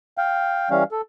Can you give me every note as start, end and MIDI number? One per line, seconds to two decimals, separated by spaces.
0.18 0.70 77
0.18 0.70 79
0.70 0.84 52
0.70 0.84 55
0.70 0.84 61
0.70 0.84 77
0.91 1.01 69